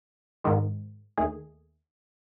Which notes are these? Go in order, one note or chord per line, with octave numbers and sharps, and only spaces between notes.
G#2 D#3 G#3
D#2 D#3 A3 G#4